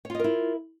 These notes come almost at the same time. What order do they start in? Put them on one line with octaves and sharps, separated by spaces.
C#5 F4 D#5 A#4 E4